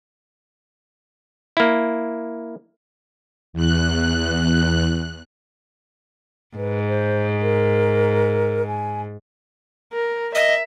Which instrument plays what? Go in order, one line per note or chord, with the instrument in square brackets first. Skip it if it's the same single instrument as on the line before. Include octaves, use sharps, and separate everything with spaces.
[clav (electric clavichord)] A#3 E4
[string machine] E2 F#6
[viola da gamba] G#2 [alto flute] B4
[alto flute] C5
A#4
G#5
[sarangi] A#4
[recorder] D#5 [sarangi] E5